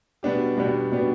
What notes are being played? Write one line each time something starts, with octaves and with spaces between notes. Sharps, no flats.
B2 G3 B3 D4 G4
B2 G3 B3 D4 G4
B2 G3 B3 D4 G4